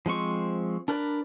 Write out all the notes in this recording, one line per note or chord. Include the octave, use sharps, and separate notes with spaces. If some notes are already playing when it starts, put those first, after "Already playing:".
F3 G#3 C4 C#6
D4 A#4 B4 D5